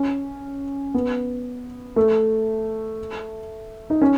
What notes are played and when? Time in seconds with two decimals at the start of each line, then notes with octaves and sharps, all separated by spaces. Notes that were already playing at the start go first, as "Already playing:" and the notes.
Already playing: C#4
0.94 B3
1.96 A3
3.90 D#4
4.01 C#4